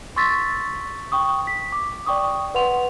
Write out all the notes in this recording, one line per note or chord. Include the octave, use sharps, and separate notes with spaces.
C6 C#6 E6 A6 B6
G5 C#6 D#6
B6
D6
D5 G5 C#6 D#6
B4 F#5 C6 F7